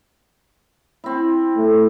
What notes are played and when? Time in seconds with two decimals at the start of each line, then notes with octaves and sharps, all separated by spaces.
1.04 C4 E4
1.57 A3